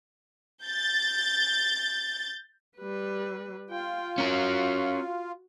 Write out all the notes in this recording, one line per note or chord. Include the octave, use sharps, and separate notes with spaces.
G6 A6
G3 B4
F4 G5
C#4 F#4 A#4